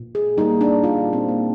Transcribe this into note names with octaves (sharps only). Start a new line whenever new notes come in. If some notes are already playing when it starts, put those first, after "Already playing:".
Already playing: A#2
G#4
G3 A#3 D#4
D4
A#2 F4
C4
G3 A#3